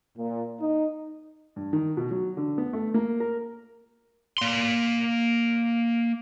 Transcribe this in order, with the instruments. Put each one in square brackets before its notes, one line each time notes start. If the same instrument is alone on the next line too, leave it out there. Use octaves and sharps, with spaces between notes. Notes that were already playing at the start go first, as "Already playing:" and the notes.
[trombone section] A#2
D#4
[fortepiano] G2
D#3
B2
F#3
D3
B3
A3
A#3
A#4
[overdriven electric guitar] A#3 C6